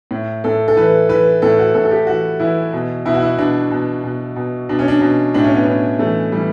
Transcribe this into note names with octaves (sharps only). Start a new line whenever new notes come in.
A2
A2 A4
A4
E3 B4
E3 B4
A2 A4
F#4
A2 A4
A4
G4
E3 F#4
E3 E4
B2
B2 E4
F#4
E4
B2 D4
B2
B2
B2
B2 D4
C#4
D4
B2
A2 D4
C#4
B3
A2 C#4
E3 A3
E3 G3